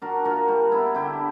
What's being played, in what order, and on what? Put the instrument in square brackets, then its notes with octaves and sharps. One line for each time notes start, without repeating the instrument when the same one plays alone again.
[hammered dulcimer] D4 F#4 A#4
A#2 F#4 A#4
G3
B3 E4
D3 E4 G4